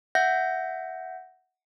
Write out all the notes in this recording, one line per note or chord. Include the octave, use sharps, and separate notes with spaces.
E5 F#5 G6 A#6